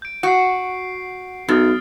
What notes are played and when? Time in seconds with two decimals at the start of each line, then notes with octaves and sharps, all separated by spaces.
0.02 G6 D7
0.23 F#4 G6 C7
1.48 B1 F#2 D#6 F6 A6